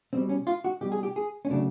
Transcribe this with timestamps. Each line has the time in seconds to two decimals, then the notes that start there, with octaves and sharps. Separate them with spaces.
0.13 B2 G3 C4
0.29 C#4
0.47 F4
0.64 F#4
0.81 B2 G3 G4
0.92 G#4
1.03 G4
1.16 G#4
1.45 C#4
1.50 C#3 F#3 A3 D4